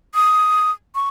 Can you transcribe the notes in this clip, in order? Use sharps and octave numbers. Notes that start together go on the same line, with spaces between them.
D#6
C#6